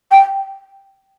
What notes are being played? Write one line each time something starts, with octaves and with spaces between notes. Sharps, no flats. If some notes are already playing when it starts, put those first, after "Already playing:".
G5